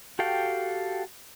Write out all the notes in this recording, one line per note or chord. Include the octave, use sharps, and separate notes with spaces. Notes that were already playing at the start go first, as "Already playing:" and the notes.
F#4 G4 A4 F5 G5